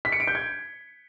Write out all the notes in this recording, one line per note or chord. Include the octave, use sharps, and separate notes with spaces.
B6
C#7
D7
G6
G#6